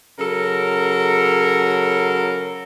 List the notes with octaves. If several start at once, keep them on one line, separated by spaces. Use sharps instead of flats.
C#3 F#3 A4 A#4